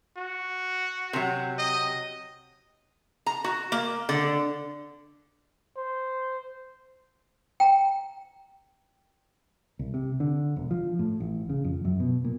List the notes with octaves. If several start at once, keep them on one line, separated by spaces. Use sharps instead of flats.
F#4
C3 F#3
D#5
A#5
F#4
A#3
D3
C5
G5 A#5
C2
C3
D3
E1
F3
A2
A1
C#3
F2
F#2
B2
A#2